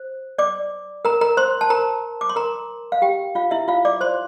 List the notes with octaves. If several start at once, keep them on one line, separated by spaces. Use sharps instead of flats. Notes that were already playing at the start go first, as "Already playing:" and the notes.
Already playing: C5
D5 D6
A#4 A#5
A#4 A#5
C5 C6
A5
A#4 A#5
D6
C6
A#4 A#5
F5
G4 G5
F4 F5
E4 E5
F4 F5
D5 D6
C5 C6